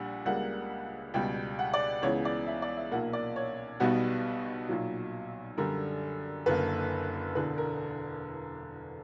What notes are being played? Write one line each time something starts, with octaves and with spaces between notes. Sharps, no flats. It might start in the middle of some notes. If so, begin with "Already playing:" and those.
Already playing: A#1 A#2 G3 F#5
C#2 C#3 G3 A#3 F#5
C#2 B2 G3 G5
F#5
D5
C#2 C#3 E3 B3 C#5
D5
E5
D5
E5
B1 A#2 A#3 F#5
D5
C#5
B1 B2 G3 B3 F#4
B1 A#2 F#3
F#2 D3 G3 A#4
F#1 F#2 D3 A#3 B4
E1 E2 D3 B4
A#4